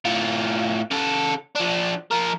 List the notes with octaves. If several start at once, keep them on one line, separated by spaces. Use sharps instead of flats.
A2 F4
C#3 A4
F3 D4
F3 A#4